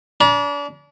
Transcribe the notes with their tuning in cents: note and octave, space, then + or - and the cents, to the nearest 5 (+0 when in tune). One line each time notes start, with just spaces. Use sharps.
D4 -35 A#5 +45